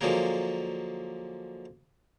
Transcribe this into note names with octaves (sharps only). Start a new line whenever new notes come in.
D3 F3 F#3 G#3 A#3 A#4